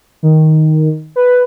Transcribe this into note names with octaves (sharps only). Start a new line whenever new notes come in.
D#3
B4